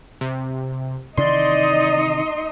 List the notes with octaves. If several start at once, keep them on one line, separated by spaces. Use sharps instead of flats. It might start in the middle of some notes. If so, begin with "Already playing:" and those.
C3
C3 D#3 E3 D#4 D5 D#5 C6